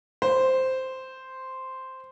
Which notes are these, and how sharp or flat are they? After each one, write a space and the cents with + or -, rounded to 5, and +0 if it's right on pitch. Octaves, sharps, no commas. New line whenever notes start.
C5 -5